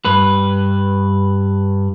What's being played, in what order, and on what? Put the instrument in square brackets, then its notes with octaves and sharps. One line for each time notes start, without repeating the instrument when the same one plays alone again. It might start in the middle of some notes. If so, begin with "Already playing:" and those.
[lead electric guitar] G2 B4